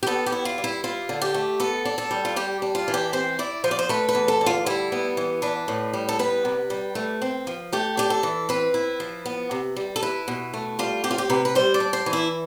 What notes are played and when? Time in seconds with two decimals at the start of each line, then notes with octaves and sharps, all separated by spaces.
0.03 G4
0.07 B3 A4
0.26 G4
0.32 E4
0.45 F4
0.58 G3
0.64 E4
0.84 E4 F4
1.09 D3
1.22 G4
1.34 A3
1.60 B3 A4
1.85 D4
1.98 A4
2.11 G3
2.25 F4
2.36 G3 G4
2.62 D4
2.75 F4
2.88 E3
2.94 G4
3.13 C4 C5
3.39 E4 D5
3.64 F3 C5
3.71 D5
3.79 C5
3.89 A3 B4
4.09 B4
4.15 E2
4.28 A4
4.41 D3
4.46 F4
4.66 G3 E4
4.92 B3
5.17 E3
5.42 D4 B4
5.68 A2
5.94 G3
6.09 A4
6.19 B3 B4
6.45 C3
6.70 G3
6.95 A3
7.22 C4
7.47 F3
7.73 A3 G4
7.97 D4 G4
8.10 A4
8.23 E3
8.49 C4 B4
8.74 E4
9.00 F3
9.26 B3
9.51 C3
9.76 G3
9.96 A4
10.03 E4 B4
10.28 B2
10.54 A3
10.79 G3 F4
11.04 C4 G4
11.11 F4
11.18 G4
11.30 C3 B4
11.45 B4
11.55 G3 C5
11.74 D5
11.80 D4
11.93 C5
12.06 E3
12.13 E4